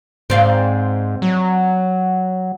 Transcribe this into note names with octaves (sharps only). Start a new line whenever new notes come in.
G#2 C4 D5 F5
F#3